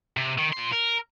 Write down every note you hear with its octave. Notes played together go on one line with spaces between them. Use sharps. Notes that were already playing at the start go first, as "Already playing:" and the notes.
C3
D#3
A#2 C6
A#4